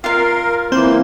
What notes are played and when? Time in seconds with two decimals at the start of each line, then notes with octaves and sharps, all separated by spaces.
0.04 F4 A#4 F5
0.72 E3 A#3 C4 C5 G6